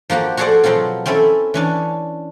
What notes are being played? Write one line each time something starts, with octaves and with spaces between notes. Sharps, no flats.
F3 A#3 F#4 G4
F#4 G#4 A4 C5 D5 F#5
B2 F3 F#3 C4 F4
C4 C#4 E4 A4 E5
E3 C#4 D4